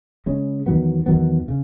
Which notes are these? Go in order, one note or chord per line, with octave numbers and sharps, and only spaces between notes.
C#3 G#3 C#4
E2 D#3 F#3 B3
E2 D#3 F#3 B3
C#3